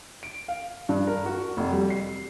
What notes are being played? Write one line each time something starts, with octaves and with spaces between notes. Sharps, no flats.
D7
F5
G2
A#4
F#4
F1
G3
C7